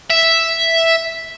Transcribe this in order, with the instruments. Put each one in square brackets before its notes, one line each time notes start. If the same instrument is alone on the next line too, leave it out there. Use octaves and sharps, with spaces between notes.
[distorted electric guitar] E5